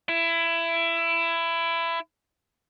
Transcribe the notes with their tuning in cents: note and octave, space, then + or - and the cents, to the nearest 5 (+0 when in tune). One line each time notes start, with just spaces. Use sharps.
E4 +20